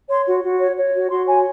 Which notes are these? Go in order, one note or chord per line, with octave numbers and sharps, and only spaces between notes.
C#5 C6
F#4
F#4
C#5
C#5
F#4
F#4 C6
C#5 G#5